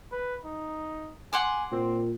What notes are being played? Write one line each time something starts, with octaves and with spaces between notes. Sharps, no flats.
B4
D#4
F#5 G#5 C6 D6
A#2 C4